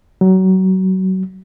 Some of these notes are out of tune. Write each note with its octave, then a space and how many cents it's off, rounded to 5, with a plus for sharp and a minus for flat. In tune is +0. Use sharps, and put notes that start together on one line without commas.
F#3 +25